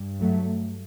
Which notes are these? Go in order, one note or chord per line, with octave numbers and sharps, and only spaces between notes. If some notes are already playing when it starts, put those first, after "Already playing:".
Already playing: G2
F#3 A3